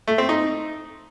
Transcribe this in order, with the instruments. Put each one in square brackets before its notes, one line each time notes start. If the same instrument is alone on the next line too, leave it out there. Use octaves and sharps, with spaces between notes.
[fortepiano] A3
C4
D#4